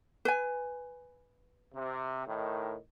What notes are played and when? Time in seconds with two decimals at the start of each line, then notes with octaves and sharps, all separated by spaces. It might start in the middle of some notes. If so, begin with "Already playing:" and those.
0.25 B4 G#5
1.74 C3
2.27 A2 D#3